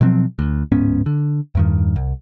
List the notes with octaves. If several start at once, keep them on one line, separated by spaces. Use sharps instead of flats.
B2 F3 F#3 C4
D2
D1 G#2 B3 C#4
D3
E2 G2 D#3
C2